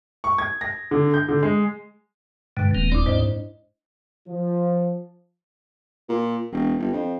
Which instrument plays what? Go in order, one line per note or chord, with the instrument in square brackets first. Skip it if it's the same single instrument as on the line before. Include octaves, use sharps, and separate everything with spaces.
[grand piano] C#6
G#6
A#6
D3
G6
D3
G#3
[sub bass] G2 [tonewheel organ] B2 D3 [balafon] G#3 B4
[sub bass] D#1 [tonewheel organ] D#3 A#3 C4
[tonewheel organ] D#2 C4 D5 [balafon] D4 E4
[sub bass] G#2 [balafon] C5 D#5
[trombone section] F3
[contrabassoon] A#2
E1
G1
F2